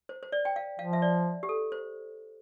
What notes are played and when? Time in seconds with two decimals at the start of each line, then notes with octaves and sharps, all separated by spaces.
0.09 C5
0.23 C5
0.32 D5
0.45 G5
0.56 F5
0.79 F3 F5
0.93 E5
1.02 D5
1.43 G4
1.49 A4
1.72 C5